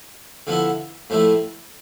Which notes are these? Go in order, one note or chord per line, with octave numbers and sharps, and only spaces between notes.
D3 F3 B3 E4
A2 F3 A3 E4